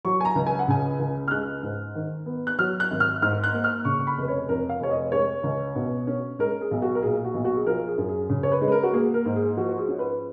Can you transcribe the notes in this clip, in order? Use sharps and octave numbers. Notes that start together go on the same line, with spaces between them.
F#3 C#6
G#5
A#5
C#2
G#5
F#5
C#3 G#5
C#2
F6
G#3 F#6
G#2
D#3
B3
F#6
F#3 F6
F#6
G#1
F6
G#2 F6
F#6
A#3
F6
C#3 C#6
C#6
B5
F1 B4
C#5
F2 A#4
F5
F1 C#5
D#5
G#3 C#5
C#2
B2
C#4
G#3 A#4
G#4
B1
F#4
A#4
A#2 G#4
F#4
B1
F#4
G#4
F3 A#4
G#4
F#2
G#4
C#3
C#5
B4
G#3
B4
A#4
F#4
A#3 G#4
A#4
G#2
G#4
F3 F#4
F#4
G#4
C#4
B4